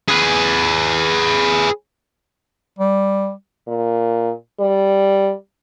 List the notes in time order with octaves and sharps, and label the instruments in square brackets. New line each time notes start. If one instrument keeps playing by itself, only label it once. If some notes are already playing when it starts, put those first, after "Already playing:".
[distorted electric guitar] G#4 B4
[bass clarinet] G3
[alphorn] A#2
G3